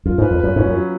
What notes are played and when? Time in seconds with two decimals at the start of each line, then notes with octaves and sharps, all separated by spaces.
0.06 F#2 F4
0.18 G#2
0.22 B4
0.31 F2
0.40 F#2 B4
0.56 G#2 C#4
0.66 F#2
0.73 F#3